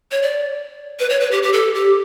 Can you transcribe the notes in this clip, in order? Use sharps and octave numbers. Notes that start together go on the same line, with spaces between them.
C#5
D5
B4
C#5
B4
G4
G4
A4
G4